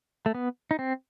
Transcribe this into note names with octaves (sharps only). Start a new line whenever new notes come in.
A3
B3
D#4
C4